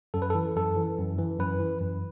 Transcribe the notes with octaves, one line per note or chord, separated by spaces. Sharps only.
F#2 A4
B4
A4
E3
F#2 A4
E3
F#2
E3
F#2 B4
E3
F#2